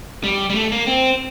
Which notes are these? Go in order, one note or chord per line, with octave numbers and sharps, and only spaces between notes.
G3
G3
A3
A#3
C4